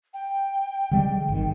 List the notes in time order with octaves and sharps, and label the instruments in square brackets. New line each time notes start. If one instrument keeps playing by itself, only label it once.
[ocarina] G5
[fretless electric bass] D3 G3 G#3
G#1 G#2 D#3